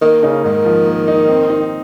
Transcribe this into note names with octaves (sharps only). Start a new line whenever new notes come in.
D#3 A#3
C#3 D#4
G#2 D#3
F3
A#3
D#4
C4
D#4